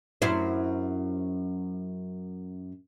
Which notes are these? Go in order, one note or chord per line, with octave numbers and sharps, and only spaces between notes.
F#2 E4 C5